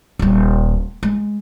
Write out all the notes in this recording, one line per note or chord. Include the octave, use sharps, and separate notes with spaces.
D#1 G3
G#3